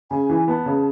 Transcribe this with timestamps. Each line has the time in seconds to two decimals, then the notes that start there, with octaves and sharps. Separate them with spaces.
0.10 C#3 G#5
0.30 E3
0.48 B3 A5
0.66 C#3